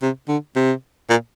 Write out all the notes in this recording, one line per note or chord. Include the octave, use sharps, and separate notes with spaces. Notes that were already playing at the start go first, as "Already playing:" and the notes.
C3
D3
C3
A#2